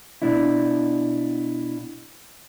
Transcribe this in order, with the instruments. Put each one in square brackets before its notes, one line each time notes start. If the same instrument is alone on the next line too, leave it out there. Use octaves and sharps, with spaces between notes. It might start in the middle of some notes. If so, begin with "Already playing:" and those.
[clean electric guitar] B2 D4 E4